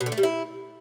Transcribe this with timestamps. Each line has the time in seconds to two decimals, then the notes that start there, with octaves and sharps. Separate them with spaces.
0.01 B2
0.06 D3
0.12 A3
0.18 G3
0.23 E4